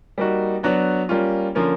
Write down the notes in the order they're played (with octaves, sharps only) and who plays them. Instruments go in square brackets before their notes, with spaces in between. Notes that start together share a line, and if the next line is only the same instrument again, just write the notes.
[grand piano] G3 A#3 D#4 F#4
F#3 B3 D4 F#4
G3 A#3 C#4 F4
D3 F3 A#3 C#4 F4